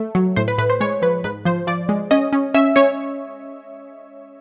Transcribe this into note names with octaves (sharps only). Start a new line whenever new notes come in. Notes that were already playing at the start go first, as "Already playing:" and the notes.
Already playing: A3
F#3
A2 C5
B4
A2 B4
C5
G#3 C#5
F3 B4
G#2 B4
F3 C5
F3 D5
G#3
C#4 D#5
C#4
C#4 E5
C#4 C#5